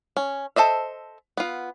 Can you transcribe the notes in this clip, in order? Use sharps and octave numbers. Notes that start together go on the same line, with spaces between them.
C#4
A4 C5 D#5 E5
B3 F4